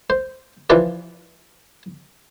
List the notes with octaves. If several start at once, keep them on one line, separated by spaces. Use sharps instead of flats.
C5
E3 F3 F4 B4 D5